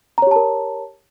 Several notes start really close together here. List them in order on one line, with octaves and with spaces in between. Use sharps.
A#5 C#5 G4 A5 A#4